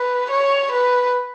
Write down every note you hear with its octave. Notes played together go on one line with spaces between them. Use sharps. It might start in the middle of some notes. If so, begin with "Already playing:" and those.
Already playing: B4
C#5
B4